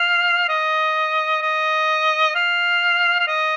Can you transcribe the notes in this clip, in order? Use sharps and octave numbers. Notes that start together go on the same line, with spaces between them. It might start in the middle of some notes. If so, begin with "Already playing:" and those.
Already playing: F5
D#5
D#5
F5
F5
D#5